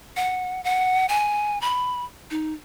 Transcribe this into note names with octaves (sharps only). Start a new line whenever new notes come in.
F#5
F#5
G#5
B5
D#4